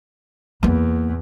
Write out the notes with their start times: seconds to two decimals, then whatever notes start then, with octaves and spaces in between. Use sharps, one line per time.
0.63 E2 A#3 B3